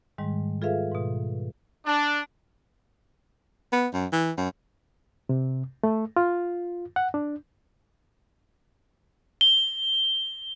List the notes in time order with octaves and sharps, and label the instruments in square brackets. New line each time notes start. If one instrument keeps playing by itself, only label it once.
[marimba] G#2 D#3 G3 G#3
F4 G#4 A4 B4 E5 F5
G#2 B2
[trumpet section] D4
[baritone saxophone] B3
F#2
E3
F#2
[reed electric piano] C3
A3
F4
F#5
D4
[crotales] G7